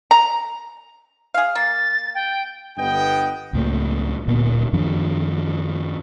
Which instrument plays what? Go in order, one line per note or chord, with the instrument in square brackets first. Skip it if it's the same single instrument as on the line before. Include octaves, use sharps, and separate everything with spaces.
[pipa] A#5
G#4 F5
[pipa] A#3 [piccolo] A6
[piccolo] G5
[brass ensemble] G1 G2 B3 D#5 G5
[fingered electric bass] C#2 A2 A#3
D1 A#2 B3
F#2 D#3 F3 D4